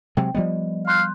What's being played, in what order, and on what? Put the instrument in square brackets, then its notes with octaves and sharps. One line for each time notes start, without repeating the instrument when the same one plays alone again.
[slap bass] C3 F#3 G#3 [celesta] G5
[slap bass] F3 G3 B3 [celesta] D5 D#5
[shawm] F5 [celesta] C6 F#6 G6